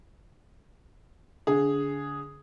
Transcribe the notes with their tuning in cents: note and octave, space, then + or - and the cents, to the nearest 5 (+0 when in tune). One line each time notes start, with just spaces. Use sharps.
D3 -30 G#4 +0